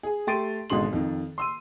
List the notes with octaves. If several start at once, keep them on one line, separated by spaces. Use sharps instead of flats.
G#4 G#5
A3 G4 C6 A6 D7 D#7
G#1 B2 D3 G#3 C6 F#7
F2 D#3
C6 E6 D#7